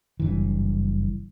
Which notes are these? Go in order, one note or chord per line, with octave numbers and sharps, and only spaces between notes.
F#1 G2 E3